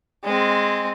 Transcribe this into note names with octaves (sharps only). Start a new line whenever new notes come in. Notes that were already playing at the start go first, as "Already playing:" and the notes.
G#3 C4